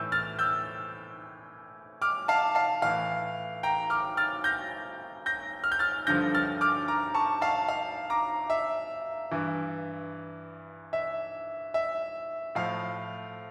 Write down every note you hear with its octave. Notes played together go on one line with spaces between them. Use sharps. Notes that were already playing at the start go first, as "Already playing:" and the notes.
Already playing: A2 E3 E6 G6
F6 A6
E6 G6
D6 F6
F5 A5
F5 A5
A2 E3 F5
G5 A#5
D6 F6
F6 A6
G6 A#6
G6 A#6
F6
G6
F6 A6
G2 D3 F3 G6 A#6
F6 A6
D6 F6
A#5 D6
A5 C#6
F5 A5
F5
A#5 D6
E5
G2 E3
E5
E5
A2 F3 F5